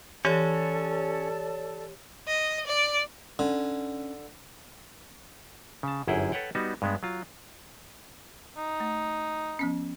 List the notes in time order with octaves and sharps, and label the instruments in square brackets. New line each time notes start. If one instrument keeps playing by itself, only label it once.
[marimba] E3 [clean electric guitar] C#4 [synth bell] G4 C#5 [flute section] A4 D5 A5
[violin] D#5
D5
[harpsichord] D3 [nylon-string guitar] C#4
[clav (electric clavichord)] C#3 A5
G1 F#2 E4 G#4 F#5 G5
A4 B4 C#5 F#5 G5
G3 B3 D#4 F#4
G2 G#3 B3
F#3 F4
[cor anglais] D#4
[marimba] A3
F3 B3 C#4